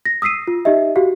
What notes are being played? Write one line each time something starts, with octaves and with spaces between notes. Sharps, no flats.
A#6
D#6 E6 B6 C7 D#7
F4
D#4 G4 D#5 E5
F#4 G4 F5